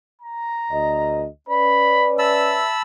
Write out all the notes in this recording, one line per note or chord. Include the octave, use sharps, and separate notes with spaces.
A#5
D2 D#5
C#4 B4 D5 B5
E5 A5 B5 E6